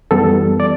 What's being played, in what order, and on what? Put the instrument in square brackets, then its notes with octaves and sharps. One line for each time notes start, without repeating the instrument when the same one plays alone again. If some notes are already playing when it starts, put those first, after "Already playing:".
[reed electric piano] F#2 E3 G3 B3 A4
D5